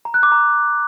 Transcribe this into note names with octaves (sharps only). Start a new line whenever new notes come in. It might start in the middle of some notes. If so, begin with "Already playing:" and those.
A#5
F#6
D6
A#5